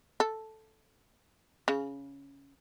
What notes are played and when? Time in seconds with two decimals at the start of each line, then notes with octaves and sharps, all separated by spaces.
0.20 A4
1.68 C#3